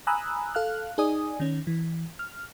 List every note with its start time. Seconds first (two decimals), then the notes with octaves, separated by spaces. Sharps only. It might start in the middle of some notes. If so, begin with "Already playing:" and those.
0.07 G#5 A#5 B5 D#6 E6 F#6
0.55 A4 F5 F6 F#6
0.98 D#4 G#4 D5 G#5 D#6
1.40 D#3 C#4
1.67 E3
2.19 F6